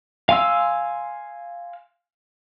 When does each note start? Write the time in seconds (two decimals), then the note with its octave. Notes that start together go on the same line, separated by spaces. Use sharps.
0.29 F5 G#5 C6 E6